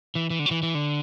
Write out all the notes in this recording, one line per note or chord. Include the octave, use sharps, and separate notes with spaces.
E3
E3
D3
F#3
E3
E3
D3